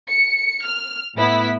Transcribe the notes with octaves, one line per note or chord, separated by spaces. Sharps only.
C#7
F6
A2 B3 E4 B6